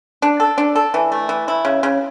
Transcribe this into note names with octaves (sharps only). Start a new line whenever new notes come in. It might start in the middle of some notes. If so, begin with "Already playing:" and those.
D4
A4
D4
A4
E3
A3
E3
E4
C#3
C#3